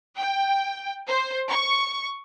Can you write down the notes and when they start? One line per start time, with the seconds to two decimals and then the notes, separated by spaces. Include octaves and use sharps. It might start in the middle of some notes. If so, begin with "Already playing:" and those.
0.16 G5
1.07 C5
1.49 C#6